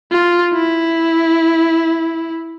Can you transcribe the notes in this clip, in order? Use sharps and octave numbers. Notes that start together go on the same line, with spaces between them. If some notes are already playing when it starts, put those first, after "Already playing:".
F4
E4